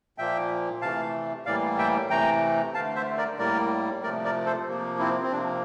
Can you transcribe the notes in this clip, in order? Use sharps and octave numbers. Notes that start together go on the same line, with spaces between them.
A#2 F3 A#3 E5 G5
C3 E3 A3 F5 A5
A2 E3 G3 A#3 D5 F5
E5 G5
C3 E3 A3 G5 A#5
D3 A3 F5 A5
C5 E5
A#4 D5
A2 G3 A#3 A#4 D5
C3 F3 A3 A#4 D5
A#4 D5
A4 C5
C3 F3 A#3
C4 E4
C4
C3 F3 A#3 D4